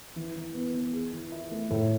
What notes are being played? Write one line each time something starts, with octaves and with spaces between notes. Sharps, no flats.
E3
E3
B3
B3
G#4
E3
E4
A3
A2